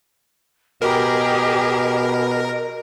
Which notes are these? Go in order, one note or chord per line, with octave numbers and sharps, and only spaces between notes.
B2 G4 G#4 A#4 D#5